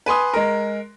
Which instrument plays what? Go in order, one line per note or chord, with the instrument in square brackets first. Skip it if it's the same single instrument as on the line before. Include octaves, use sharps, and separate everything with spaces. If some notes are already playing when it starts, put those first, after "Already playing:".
[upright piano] B4 G#5 C6 D#6
G#3 A#4